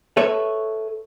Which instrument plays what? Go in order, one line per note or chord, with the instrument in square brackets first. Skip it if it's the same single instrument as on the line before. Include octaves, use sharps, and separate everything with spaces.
[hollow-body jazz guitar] A4 B4 C#5 E5